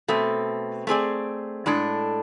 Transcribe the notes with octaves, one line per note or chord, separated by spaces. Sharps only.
B2 A3 C4
A3 C4 G#4 D5
A2 G#3 D4 A4